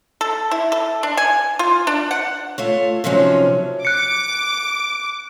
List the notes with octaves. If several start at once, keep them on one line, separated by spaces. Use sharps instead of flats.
A4
E4
A4
D4
G#5
F4
D4
F#5
A3 F4 C#5
C3 D#3 F3 F#3 C#4
D6 F#6 C#7